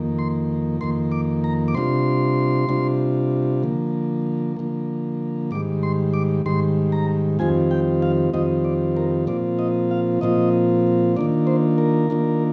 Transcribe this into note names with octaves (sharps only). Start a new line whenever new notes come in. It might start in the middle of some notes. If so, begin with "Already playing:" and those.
Already playing: F2 D#3 A#3
C6
F2 D#3 A#3 C6
D6
A#5
D6
C3 G3 D4 F4 C6
C3 G3 D4 F4
D3 F3 A#3
D3 F3 A#3
G#2 D#3 G3 D6
C6
D6
G#2 D#3 G3 C6
A#5
F2 D#3 G3 C4 F4 G#5
G5
F5
F2 D#3 G3 C4 F4 D#5
D5
A#4
A#2 F3 C4 F4 D5
D#5
F5
A#2 F3 C4 F4 D#5
D#3 A#3 D4 F4 D5
C5
A#4
D#3 A#3 D4 F4